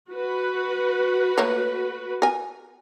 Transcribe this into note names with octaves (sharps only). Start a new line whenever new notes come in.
F#4 B4
A3 A#3 C#5
A#4 G#5